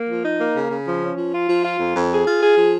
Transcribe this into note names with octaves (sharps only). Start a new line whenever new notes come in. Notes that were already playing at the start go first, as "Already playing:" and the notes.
Already playing: A#3
F3
D#4
A#3
C#3
C#3
F3
C#4
F3
F4
F3
F4
F2
F2
G#4
F4
G#4
F3